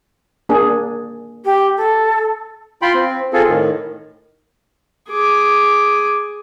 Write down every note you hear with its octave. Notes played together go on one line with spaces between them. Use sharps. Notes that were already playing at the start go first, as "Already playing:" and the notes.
A#3 D4 G#4
G4
A4
F4 G5 B5 C6
C4
C4 F4 G#4 A4
A2 D#3
G#4 D6